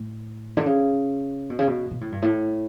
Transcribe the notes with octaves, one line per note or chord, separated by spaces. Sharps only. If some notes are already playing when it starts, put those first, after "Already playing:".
Already playing: A2
D3
C#3
B2
C#3
B2
B2
A2
G2
A2